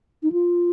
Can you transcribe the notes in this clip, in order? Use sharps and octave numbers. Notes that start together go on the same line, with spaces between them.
D#4
F4